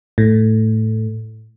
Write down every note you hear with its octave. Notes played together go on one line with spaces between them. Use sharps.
A2